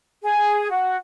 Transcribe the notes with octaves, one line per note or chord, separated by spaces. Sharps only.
G#4
F#4